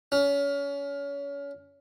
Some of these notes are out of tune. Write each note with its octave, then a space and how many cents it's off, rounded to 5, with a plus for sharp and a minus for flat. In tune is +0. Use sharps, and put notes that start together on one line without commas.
C#4 +30